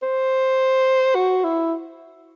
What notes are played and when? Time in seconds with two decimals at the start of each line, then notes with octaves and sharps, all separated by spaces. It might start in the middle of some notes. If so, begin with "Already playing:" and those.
0.03 C5
1.15 F#4
1.44 E4